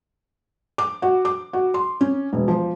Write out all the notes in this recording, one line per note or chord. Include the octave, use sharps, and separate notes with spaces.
D6
F#4
D6
F#4
C6
C#4
E1
F3